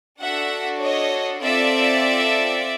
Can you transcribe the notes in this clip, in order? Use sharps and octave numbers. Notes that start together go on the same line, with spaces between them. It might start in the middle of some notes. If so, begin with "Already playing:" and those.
D4 F#4 A4 E5 F#5
C#5 D#5
C4 F4 A4 D5 E5